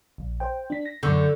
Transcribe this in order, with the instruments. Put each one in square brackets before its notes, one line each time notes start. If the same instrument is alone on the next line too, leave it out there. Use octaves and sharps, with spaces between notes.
[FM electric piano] A#1
C5 G5
D4 B6
A#6
[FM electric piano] F#2 C#6 G6 [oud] D3